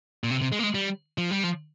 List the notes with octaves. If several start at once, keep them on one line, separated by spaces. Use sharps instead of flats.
A#2
C3
C3
G#3
A#3
G#3
G3
F3
G3
F3